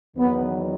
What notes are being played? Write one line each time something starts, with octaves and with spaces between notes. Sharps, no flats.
E2 D#3 F#3 B3